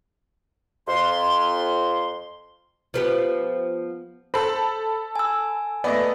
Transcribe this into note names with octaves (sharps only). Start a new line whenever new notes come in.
F2 C6
F3 B3 G4
A4 C5 B5
G#5 E6
A3 B3 D5 D#5